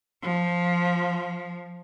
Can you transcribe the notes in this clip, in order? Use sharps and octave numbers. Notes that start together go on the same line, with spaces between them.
F3